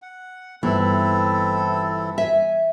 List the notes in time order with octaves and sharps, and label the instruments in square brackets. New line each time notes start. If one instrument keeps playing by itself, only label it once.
[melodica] F#5
[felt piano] G1 [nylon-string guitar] E3 [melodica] C4 E4 A4
[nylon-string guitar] E5 [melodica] G#5